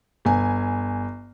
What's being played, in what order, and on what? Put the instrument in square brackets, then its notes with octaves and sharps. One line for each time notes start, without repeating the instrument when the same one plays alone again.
[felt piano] G1 G#5